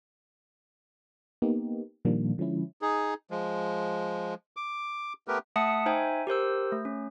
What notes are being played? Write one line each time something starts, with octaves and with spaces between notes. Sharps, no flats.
A#3 B3 D#4 G4
A#2 D#3 F3 G3 A#3 D4
D3 F3 G#3 C#4 E4
D#4 G#4
F3 G#3
D6
A3 B3 G4 A#4 B4
A3 E5 F#5 A5 D#6 C#7
D#4 C5 E5 G5 G#5
G4 A#4 C5 E6
A3
C#4